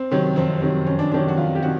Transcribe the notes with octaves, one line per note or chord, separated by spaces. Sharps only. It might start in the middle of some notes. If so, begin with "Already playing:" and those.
Already playing: C4
C3 D#3 F#3
F2 C4
C3 D#3 F#3
F2 C#4
D4
C3 D#3 F#3 D4
F#4
F2 F4
G4
C3 D#3 F#4